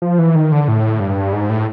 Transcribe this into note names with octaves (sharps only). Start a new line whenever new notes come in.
F3
E3
D#3
D3
A2
G2
G#2
A2